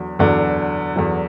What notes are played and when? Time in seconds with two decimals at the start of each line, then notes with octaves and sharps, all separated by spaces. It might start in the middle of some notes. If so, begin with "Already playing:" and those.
Already playing: E2 D3 F#3
0.19 E2 D3 F#3
0.96 E2 D3 F#3